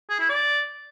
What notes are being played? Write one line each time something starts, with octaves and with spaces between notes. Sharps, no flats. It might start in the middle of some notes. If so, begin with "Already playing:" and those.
G#4
E4
D5